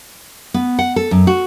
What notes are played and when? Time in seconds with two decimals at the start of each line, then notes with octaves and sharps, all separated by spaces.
0.54 B3
0.79 F#5
0.96 A4
1.11 F#2
1.27 F#4